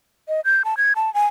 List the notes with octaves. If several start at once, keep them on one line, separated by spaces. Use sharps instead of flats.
D#5
G6
A5
G#6
A5
G#5